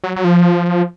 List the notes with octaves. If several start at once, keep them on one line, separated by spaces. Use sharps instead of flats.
F#3
F#3
F3